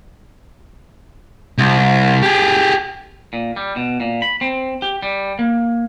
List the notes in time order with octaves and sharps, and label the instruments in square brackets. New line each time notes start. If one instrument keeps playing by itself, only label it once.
[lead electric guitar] C2
G4 G#4
[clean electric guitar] A#2
G3
B2
A#2
B5
C4
G4
G3
A#3